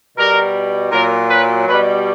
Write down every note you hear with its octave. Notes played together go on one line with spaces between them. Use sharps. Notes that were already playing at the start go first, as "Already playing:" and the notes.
B2 G3 A#4
A#2 F#3 A#4
B4
B2 G3 B4